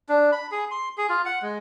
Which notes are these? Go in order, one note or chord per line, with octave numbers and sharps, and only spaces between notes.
D4
B5
G#4
C6
G#4
F4
F#5
G#3